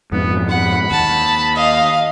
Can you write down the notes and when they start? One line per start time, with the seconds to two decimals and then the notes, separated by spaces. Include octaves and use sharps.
0.12 F2 G#2 B2 B3
0.49 F#5 B5
0.90 D#2 A5
1.56 D#5 F5